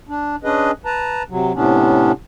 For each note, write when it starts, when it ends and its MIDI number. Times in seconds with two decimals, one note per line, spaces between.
0.09 0.36 62
0.44 0.71 61
0.44 0.71 62
0.44 0.71 68
0.44 0.71 71
0.44 0.71 75
0.85 1.23 71
0.85 1.23 81
0.85 1.23 82
1.30 1.52 48
1.30 1.52 54
1.55 2.12 45
1.55 2.12 48
1.55 2.12 59
1.55 2.12 61
1.55 2.12 62